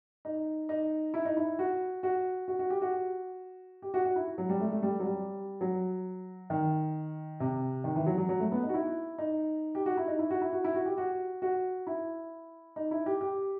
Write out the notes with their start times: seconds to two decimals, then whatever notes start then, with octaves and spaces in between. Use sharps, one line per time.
0.25 D#4
0.69 D#4
1.14 E4
1.25 D#4
1.37 E4
1.59 F#4
2.03 F#4
2.48 F#4
2.59 F#4
2.70 G4
2.82 F#4
3.82 G4
3.94 F#4
4.05 F#4
4.16 E4
4.38 F#3
4.49 G3
4.61 A3
4.72 A3
4.82 G3
5.00 F#3
5.05 G3
5.61 F#3
6.50 D#3
7.40 C3
7.84 D#3
7.96 E3
8.06 F#3
8.18 F#3
8.29 F#3
8.40 A3
8.52 B3
8.63 D#4
8.69 F#4
8.74 E4
9.18 D#4
9.75 G4
9.86 F#4
9.97 E4
10.08 D#4
10.19 E4
10.30 F#4
10.41 E4
10.53 F#4
10.64 E4
10.75 F#4
10.86 G4
10.97 F#4
11.42 F#4
11.87 E4
12.76 D#4
12.91 E4
13.06 G4
13.21 G4